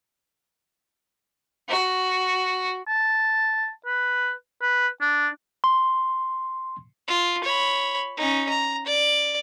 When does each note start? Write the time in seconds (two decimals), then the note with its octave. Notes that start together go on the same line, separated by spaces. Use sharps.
1.69 F#4
2.87 A5
3.86 B4
4.62 B4
5.01 D4
5.64 C6
7.08 F4
7.44 C#5 B5
8.17 C#4 D#4
8.49 A#5
8.86 D5